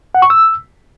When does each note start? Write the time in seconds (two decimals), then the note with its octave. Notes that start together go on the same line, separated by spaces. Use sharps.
0.15 F#5
0.22 C#6
0.30 E6